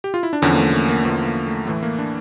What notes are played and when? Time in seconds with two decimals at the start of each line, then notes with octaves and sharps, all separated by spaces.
0.04 G4
0.14 F4
0.23 E4
0.33 D4
0.42 E2 D3 F3 C#4
0.54 A#3
0.58 A3
0.73 A#3
0.89 A#3
1.05 E2 D3 F3 A3
1.25 A#3
1.46 A3
1.67 A2 E3 A3
1.83 A#3
1.99 D4